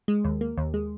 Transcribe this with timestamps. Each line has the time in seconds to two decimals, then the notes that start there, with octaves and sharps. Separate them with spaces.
0.08 G#3
0.24 D#2
0.41 A#3
0.58 D#2
0.74 G#3